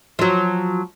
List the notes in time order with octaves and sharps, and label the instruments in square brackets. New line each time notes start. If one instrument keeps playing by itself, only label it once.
[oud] F3 F#3